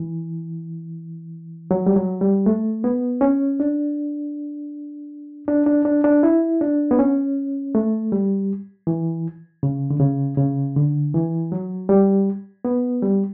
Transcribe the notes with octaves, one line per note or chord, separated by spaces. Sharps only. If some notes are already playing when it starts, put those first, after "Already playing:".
Already playing: E3
F#3
G3
F#3
G3
A3
B3
C#4
D4
D4
D4
D4
D4
E4
D4
B3
C#4
A3
G3
E3
C#3
D3
C#3
C#3
D3
E3
F#3
G3
B3
G3